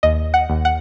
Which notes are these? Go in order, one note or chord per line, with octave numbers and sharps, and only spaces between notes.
D#2 D#5
F#5
D#2
F#5